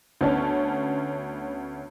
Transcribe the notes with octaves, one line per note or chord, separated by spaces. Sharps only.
D2 B3 C#4 A5